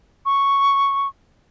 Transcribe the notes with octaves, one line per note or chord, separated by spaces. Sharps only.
C#6